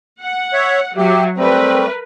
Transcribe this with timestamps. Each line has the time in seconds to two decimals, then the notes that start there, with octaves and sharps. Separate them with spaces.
0.22 F#5
0.53 C#5 E5
0.97 F#3 G4 E5
1.38 G3 A3 C4 A#4 B4